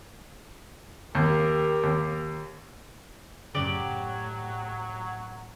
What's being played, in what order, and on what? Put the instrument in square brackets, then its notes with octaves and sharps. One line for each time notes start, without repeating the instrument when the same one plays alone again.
[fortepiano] D#2 [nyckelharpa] G4 A#4
[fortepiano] D#2
[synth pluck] F#2 C#3 [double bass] A2 [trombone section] F#3 [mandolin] G4 D5 D6